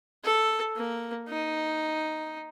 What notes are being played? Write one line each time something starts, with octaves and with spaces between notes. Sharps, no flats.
A4
A#3
D#4